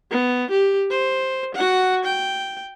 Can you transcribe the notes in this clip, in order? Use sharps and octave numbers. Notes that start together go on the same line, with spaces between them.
B3
G4
C5
F#4 F#5
G5